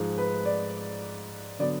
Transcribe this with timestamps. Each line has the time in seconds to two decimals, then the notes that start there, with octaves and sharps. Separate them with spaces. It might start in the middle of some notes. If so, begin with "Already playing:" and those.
Already playing: G#2 F3 G#3
0.18 B4
0.46 D5
1.59 D3 F#3 B3 D5